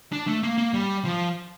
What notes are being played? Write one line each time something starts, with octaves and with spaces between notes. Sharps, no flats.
D4
A3
A#3
A#3
G3
F3